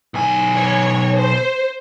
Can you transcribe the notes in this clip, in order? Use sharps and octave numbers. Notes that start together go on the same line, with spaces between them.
B1 G#5
C#5
C5